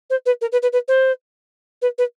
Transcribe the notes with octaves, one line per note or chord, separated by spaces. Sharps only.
C5
B4
A#4
B4
B4
B4
C5
B4
B4